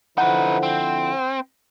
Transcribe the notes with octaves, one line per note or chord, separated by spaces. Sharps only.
D3 F3 D#4 E4 B4 F#5
C4